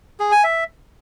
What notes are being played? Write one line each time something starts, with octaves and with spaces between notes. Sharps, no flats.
G#4
G#5
E5